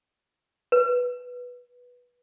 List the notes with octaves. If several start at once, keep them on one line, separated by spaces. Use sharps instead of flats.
B4